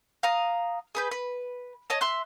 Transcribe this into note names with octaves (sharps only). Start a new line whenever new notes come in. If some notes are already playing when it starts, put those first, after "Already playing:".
F5 A#5 D#6
G#4 B4 G6
B4
C#5 D#5 A5
E5 C6 F#6